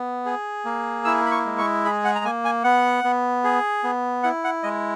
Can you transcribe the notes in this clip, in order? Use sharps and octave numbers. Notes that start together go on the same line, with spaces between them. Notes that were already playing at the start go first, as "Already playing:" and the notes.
Already playing: B3
G#4
A#3
E4 E6
B5
C#6
G#3
C#6
G#4 B5
F#5
A#5
A#3 G#5
G#5
B3 F#5
B3
G#4
B3
E4 F#5
F#5
G#3 D#5